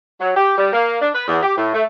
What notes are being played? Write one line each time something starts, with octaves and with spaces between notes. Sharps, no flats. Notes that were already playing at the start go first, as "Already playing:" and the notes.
F#3
G4
G3
A#3
D4
B4
E2
G4
A2
A3